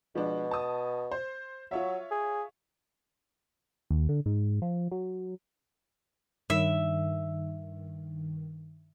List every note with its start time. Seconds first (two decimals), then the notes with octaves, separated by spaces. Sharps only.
0.15 B2 F3 G#3 D4
0.51 A5 D#6
1.11 C5
1.71 F#3 F4 C#5 E5
2.11 G#4
3.90 D#2
4.09 D3
4.26 G#2
4.62 F3
4.91 F#3
6.50 G2 D#3 E5